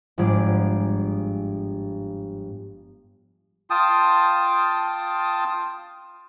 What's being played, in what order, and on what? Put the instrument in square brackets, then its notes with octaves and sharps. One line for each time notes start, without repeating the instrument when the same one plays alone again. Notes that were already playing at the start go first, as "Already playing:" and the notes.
[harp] G1 G#2 F3 D4 G#4 D6
[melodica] F4 G5 A5 D#6